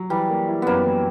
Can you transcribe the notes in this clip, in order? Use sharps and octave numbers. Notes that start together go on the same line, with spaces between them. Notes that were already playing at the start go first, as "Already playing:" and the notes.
Already playing: F#3
E3 G3
A#3
E4
F#2 A#3 B3
E3